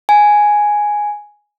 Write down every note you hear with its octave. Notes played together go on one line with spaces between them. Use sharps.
G#5